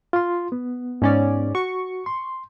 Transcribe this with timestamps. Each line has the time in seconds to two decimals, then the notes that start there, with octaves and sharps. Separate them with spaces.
0.13 F4 C6
0.52 B3
1.02 G#2 C#4 D5
1.55 F#4 C#6
2.06 C6